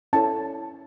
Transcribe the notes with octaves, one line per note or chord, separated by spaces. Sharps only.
C#4 E4 A4 C#5 A5